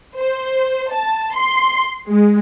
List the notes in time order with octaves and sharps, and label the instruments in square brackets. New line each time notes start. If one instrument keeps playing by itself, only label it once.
[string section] C5
A5
C6
G#3